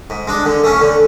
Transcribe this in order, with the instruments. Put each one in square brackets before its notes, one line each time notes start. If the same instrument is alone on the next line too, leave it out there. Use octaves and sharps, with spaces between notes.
[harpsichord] G#2
G#3 D4
D3
A3 C#4
D3